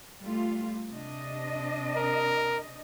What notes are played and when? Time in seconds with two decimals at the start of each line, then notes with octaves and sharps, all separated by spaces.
0.21 G3 A3 F4
0.90 C3 D4 D#5
1.96 A#4